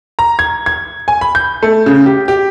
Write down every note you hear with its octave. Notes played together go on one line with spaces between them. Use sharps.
A#5
G#6
G#6
G#5
B5
G6
A3
C#3
G4
G4